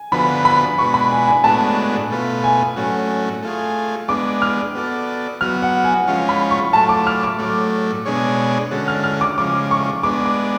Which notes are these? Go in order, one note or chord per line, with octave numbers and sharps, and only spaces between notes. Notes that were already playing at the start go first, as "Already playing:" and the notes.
Already playing: G#5
D3 F3 B3 F#4 B4 B5
B5
B2 G#3 D4 F#4 B4 C#6
B5
G#5
G#5
A2 G#3 B3 D4 F#4 A5
B2 A3 F4 B4
G#5
A2 F#3 A3 C#4 F#4
A3 F4 G#4
G#3 B3 D4 D6
F6
B3 F#4 A4 D5
F#3 B3 F#4 F6
F#5
G#5
F3 G#3 C#4 F4
B5
C#6
A2 F#3 A3 F4 A5
D6
F6
D6
A2 F#3 A3
B2 G#3 D4 G#4 C#5
D3 G#3 C#4 F#4 A4
F6
F6
D6
C#3 F3 G#3 D6
C#6
G#3 B3 D4 D6
D6